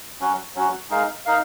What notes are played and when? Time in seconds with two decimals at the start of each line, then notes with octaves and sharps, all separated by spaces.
0.20 F#3 C#4 F#4
0.55 F#3 C#4 F#4
0.90 G#3 D#4 A#4 F5
1.26 D#4 A#4 F5